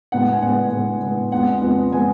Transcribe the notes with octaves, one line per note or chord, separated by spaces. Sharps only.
A2 G#3 B3 F#5
F#5
G#5
A2 G#3 B3 F#5
A2 G#3 B3
A2 G#3 B3
F2 F3 G#3 B3 F#5
F2 F3 G#3 B3
F3 G#3 B3 G#5